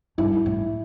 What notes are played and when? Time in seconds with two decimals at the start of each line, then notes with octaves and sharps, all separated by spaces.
0.18 G2 E4
0.46 A2